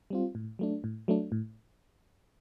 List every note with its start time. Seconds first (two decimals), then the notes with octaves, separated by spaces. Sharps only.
0.10 G3 C4 F4
0.35 A2
0.59 F#3 A3 D4
0.84 A2
1.08 F#3 A3 D4
1.32 A2